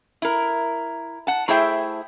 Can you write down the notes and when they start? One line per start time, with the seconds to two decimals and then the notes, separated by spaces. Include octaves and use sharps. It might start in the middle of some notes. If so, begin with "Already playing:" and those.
0.22 E4 A#4
1.27 F#5 A5
1.48 A3 E4 G#4 C5 E5 G5